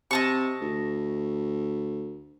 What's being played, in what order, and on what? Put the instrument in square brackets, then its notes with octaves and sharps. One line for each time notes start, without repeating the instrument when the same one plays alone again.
[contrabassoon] C3 [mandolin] D#5 A5 C#6
[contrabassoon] D2